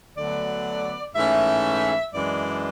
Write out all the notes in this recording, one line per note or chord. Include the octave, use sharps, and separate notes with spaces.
D2 D3 F#3 B3 D5
G#2 E3 A3 C#4 E5
F#2 E3 G#3 D4 D5